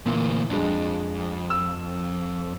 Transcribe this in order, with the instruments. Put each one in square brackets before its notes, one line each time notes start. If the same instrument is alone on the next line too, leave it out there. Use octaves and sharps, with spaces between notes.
[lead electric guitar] D2 E3 [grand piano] A#2
[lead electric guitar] F2 [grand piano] G#3 D4
[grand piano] E6